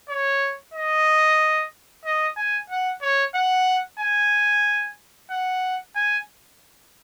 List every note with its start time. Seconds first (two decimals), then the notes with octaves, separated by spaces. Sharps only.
0.09 C#5
0.74 D#5
2.05 D#5
2.37 G#5
2.70 F#5
3.02 C#5
3.35 F#5
4.00 G#5
5.31 F#5
5.96 G#5